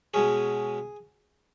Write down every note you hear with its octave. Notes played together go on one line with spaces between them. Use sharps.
B2 G#3 C#4 G#4